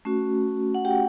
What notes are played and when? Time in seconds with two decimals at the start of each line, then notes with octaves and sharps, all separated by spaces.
0.05 A3 C#4 F#4
0.75 F#5
0.85 G4 G5